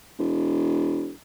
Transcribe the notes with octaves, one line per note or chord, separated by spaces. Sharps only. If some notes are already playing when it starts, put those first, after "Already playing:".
E1